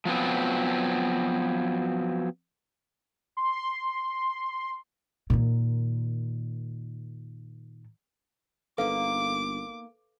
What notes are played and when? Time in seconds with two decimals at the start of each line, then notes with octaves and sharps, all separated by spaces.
0.05 F3 F#3 B3 C4
3.37 C6
5.30 A#2 D#3
8.78 G1 A#3 B3 D#4 A4 B4 F5 D6